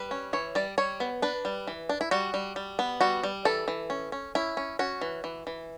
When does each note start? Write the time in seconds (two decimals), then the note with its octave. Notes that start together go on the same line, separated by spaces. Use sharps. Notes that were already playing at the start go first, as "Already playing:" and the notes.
Already playing: G3 B4
0.11 C#4
0.33 E3 C#5
0.55 G3 D5
0.78 G3 C#5
1.00 B3
1.22 D4 B4
1.45 G3
1.67 E3
1.89 D4
2.01 E4
2.11 G3 F#4
2.34 G3
2.56 G3
2.79 B3
3.01 G3 F#4
3.23 G3
3.45 E3 A4
3.68 E3
3.90 C#4
4.12 C#4
4.35 C#4 E4
4.57 C#4
4.79 C#4 F#4
5.01 E3
5.24 E3
5.47 E3